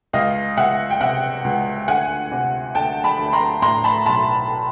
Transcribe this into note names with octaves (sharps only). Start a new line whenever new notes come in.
C#2 D#5 F5
C#2 E5 F#5
G5
C3 E5 F#5
C#2
D2 F#5 G#5
C3
D2 G5 A5
A5 B5
D2
A#5 C6
A2 A#5 C6
A5 B5
B1 A5 B5